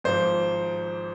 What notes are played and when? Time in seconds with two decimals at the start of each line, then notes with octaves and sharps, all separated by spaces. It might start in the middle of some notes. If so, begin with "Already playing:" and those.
0.04 G#1 G#2 F3 C5